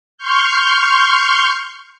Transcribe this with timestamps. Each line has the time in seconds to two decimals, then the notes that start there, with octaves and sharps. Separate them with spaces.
0.18 C6 C#6 F6 G6